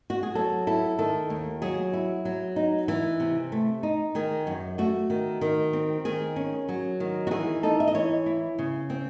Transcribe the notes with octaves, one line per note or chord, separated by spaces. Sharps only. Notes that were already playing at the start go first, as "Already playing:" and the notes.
F#4
G#4
F#3 A4
E4 A4
D#3 A4
D#2
F#3 G#4
E4
F#3
D#4
E3
C3
A3
D#4
D#3 G#4
F#2
A3 F#4
D#3
D#3
C4
D#3 G#4
C#4
F#3
D#3
F#4
E3 G#4
D#4 A4
E5
D#5
E3 C#5
E4
C#3
C4